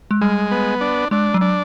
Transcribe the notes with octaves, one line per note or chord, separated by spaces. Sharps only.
G#3
G3 G#3
B3
D4
G#3 D4
F#3
D4